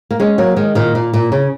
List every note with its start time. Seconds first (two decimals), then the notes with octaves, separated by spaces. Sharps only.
0.11 A#3
0.20 G#3 C#4
0.38 F#3 A#3
0.56 D#3 G#3
0.75 A#2 D#3
0.95 A#2
1.14 A#2
1.32 C#3